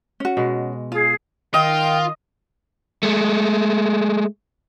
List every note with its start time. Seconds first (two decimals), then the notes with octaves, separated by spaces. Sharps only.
0.20 C#4 F#4
0.37 B2 G#3
0.92 F4 G#4
1.54 D#3 F4 D#5 G5
3.03 G#3 A3